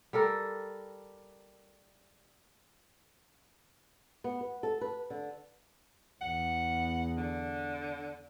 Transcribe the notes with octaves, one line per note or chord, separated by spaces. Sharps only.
G3 A4 A#4
B3
B4
A4
B4
D3
E2 F#5
D3